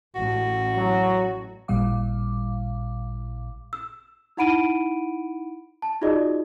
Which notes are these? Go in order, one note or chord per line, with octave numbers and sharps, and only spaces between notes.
A1 A2 F#4
F#3
A1 A#2 G3 F5 D6
E6
D#4 E4 F#5 B5 D7 D#7
A5
D#4 F4 F#4 G#4 D5 D#5